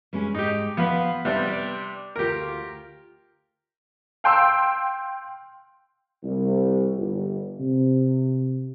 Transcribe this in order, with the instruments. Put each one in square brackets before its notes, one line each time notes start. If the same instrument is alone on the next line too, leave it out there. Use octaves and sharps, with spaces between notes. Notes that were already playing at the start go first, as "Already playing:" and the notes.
[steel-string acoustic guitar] G3 G#3 C#4
[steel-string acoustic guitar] G#2 [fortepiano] D#4 G4
[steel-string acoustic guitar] F3 F5 [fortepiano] B3 B4
[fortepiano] C3 G3 D4 [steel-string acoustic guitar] B3
[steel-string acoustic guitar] D5
[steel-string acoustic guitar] D2 F4 [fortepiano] G4 A#4
[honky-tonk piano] F5 G5 C6 E6
[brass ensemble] C2
G1
C3